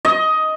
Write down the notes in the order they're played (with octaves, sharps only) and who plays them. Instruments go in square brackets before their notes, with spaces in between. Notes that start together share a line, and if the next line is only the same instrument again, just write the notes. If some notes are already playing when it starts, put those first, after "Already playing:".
[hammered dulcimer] D#5